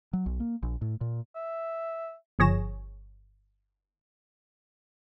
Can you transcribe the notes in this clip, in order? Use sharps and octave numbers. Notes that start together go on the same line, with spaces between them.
F#3
B1
A#3
A#1
A2
A#2
E5
G1 F3 G#4 C#5 A#6 E7